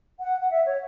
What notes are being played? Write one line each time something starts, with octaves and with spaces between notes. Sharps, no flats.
F#5
F#5
E5
C#5